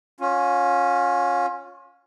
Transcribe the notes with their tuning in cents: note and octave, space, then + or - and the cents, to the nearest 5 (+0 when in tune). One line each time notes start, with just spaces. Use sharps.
C#4 +0 F4 +35